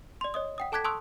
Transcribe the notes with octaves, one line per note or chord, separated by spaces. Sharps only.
D5 C6
C#5 D#5 D#6
F#5 G5 D#6
A4 A5 D6 F#6 G#6 B6
A5 C6 C#6 D#6 E6 F#6